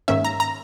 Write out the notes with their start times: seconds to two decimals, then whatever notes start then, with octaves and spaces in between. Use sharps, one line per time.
0.08 G#2 D#3 A#3 C#4 E5
0.25 A#5
0.40 A#5